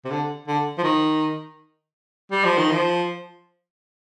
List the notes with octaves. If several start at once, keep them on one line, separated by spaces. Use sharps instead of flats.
C3
D3
D3
F3
D#3
G3
F3
D#3
F3